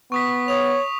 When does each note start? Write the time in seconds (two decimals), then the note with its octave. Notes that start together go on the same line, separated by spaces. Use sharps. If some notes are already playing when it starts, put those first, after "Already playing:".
0.12 B3 C#6 D#6 B6
0.48 C#5 D#6 F7